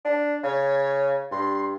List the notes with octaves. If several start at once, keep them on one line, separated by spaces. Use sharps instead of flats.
D4
C#3 C#5
G2 C6